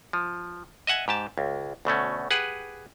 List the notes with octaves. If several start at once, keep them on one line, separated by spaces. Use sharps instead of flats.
F3
D#5 E5 F#5 G#5
G#2 G4 A5
C#2
D2 B2 A3 C#4
G4 G#4 B4 F#5